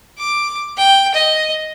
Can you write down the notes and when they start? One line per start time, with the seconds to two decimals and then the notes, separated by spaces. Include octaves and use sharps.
0.19 D6
0.77 G5
1.14 D#5